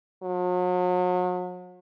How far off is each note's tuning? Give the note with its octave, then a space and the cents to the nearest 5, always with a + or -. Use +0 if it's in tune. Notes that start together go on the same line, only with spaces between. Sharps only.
F#3 -40